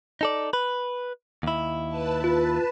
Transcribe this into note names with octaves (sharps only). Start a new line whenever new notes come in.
D#4 A4 D5
B4
D#2 E4
B4 A5
F4